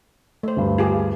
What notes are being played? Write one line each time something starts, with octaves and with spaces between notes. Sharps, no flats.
A3 C5
D2 G2
F4 G4 G#4